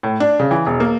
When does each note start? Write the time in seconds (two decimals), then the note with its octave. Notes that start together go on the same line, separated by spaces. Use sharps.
0.03 A2
0.20 D4
0.40 C#3
0.51 E3
0.66 E1
0.80 A#3